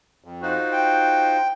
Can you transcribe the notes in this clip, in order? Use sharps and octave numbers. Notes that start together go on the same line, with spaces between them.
F2
D#4 F4 F#4 C5
G5